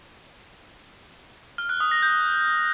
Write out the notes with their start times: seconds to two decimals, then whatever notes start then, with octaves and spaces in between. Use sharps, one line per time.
1.58 F6
1.69 F#6
1.80 D#6
1.91 A#6
2.02 G6